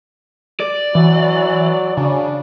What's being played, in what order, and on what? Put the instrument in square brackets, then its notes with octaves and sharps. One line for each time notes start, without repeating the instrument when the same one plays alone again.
[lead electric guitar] D5
[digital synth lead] E3 [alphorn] F#3
[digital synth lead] C#3 [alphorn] D4